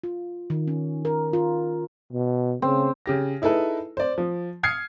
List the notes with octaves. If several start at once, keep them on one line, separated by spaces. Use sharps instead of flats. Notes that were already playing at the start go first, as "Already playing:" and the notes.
F4
D#3
C#4
A#4
F4
B2
C#3 C4
C#3 G4 A#6
D#4 E4 G#4 A4 B4
C5 D5
F3
D#6 F6 G#6 C7 C#7